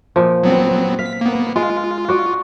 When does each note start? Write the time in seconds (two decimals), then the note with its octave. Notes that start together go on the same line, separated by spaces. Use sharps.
0.16 A#2 F3
0.43 F#3 B3 C4
0.99 F5 B6
1.21 A#3 B3
1.56 G#3 F4
2.08 F#4 D5